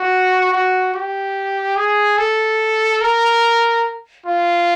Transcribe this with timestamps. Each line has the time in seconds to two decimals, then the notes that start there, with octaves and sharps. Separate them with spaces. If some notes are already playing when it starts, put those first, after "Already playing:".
Already playing: F#4
0.52 F#4
0.94 G4
1.76 G#4
2.18 A4
3.01 A#4
4.26 F4